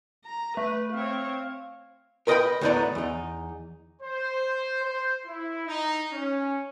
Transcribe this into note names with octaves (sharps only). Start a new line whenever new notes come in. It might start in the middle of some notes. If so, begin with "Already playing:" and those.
A#5
A3 B4
C4 C#5 F5
A#4 B4 D#5 F5 G5 B5
D2 A2 B3 D#4 D5 A#5
E2 D#4
C5
C5
E4
D#4
C#4